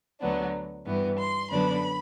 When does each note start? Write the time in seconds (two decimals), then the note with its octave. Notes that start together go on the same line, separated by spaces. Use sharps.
0.20 D2 D3 F#3 B3 D4
0.85 G2 E3 B3
1.18 C6
1.50 F#2 D3 F#3 B3 D4 B5